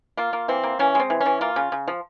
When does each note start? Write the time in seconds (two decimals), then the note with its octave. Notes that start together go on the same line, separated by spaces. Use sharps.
0.17 A#3 F4
0.33 A#3
0.48 E3 C4
0.64 A#3
0.79 E3 C#4
0.95 G#3 C4
1.10 E3
1.20 C#4
1.26 E3
1.41 A#3 F4
1.56 C#3
1.72 C#3
1.88 F3